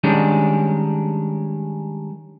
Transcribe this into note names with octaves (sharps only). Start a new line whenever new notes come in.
D#3 G3 G#3 C#4 D4